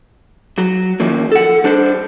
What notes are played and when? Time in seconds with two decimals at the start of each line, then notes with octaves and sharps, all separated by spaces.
0.58 F#3
1.00 D#3 F3 A#3 C#4
1.32 A4 F#5
1.64 G3 D4 C5